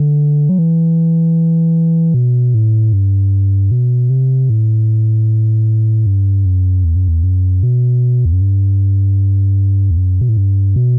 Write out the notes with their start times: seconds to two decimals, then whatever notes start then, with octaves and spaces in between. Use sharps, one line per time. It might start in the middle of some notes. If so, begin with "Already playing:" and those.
Already playing: D3
0.49 F#3
0.59 E3
2.14 B2
2.54 A2
2.93 G2
3.71 B2
4.10 C3
4.50 A2
6.06 G2
6.45 F#2
6.84 E2
6.96 F#2
7.08 E2
7.23 F#2
7.63 B2
8.25 E2
8.33 F#2
8.41 G2
9.91 E2
9.97 F#2
10.21 B2
10.29 A2
10.37 G2
10.76 B2